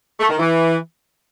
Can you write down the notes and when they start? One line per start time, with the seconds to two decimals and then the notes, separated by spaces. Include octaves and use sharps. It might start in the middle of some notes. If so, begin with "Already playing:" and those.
0.20 A3
0.30 D#3
0.39 E3